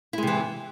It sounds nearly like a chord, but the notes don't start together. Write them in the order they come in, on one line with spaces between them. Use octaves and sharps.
E4 G#3 C3 E3